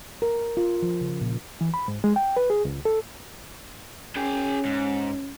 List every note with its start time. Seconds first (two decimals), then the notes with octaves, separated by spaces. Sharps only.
0.22 A#4
0.57 F4
0.82 F3
1.01 C#3
1.21 A#2
1.61 E3
1.74 B5
1.88 G#2
2.04 G#3
2.16 G5
2.37 B4
2.50 G#4
2.65 C#2
2.85 A4
4.16 C#4 G#4 G5
4.65 G#2